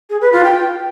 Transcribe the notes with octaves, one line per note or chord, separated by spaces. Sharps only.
G#4
B4
F4
G5